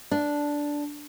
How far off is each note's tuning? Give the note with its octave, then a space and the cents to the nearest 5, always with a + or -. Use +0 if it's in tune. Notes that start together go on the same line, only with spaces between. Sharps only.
D4 -5